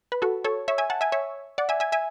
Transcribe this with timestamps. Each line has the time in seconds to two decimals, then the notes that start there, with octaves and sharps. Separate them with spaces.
0.12 B4
0.22 F#4 A4
0.44 A4 C#5
0.68 C#5 E5
0.78 E5 G#5
0.90 F#5 A5
1.01 E5 G#5
1.12 C#5 E5
1.58 D5 F#5
1.69 E5 G#5
1.80 E5 G#5
1.92 E5 G#5